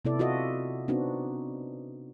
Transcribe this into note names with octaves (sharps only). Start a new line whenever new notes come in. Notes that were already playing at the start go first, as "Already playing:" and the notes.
C3 B3 E4 A4 D5
F4 F#4 A4 D#5 E5
B3 C4 D4 D#4 F#4